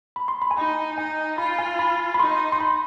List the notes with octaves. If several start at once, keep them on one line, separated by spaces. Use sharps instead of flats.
B5
C6
B5
G#5
D#4 B5
D#4 G#5
F4 B5
G#5
B5
B5
D#4 C6
C6
B5